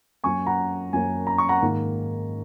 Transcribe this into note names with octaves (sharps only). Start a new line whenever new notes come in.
F#2 F#3 A#3 C#4 G#5 C#6
F#5 A#5
F#2 F#3 A#3 C#4 G#5
A#5
C#6
F#5 A#5
G#2 D#3 A#3